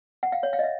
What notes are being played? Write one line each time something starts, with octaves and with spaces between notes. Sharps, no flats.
F#5
F5
C#5
F5
D#5
E5